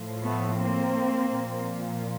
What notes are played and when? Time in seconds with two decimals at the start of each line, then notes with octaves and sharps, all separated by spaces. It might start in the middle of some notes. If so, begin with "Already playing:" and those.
Already playing: A2 F3
0.23 A3 B3
0.59 A#3 C4
1.32 A#2 F3